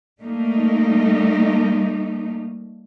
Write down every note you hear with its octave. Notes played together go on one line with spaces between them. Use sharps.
G3 A3 A#3 D#4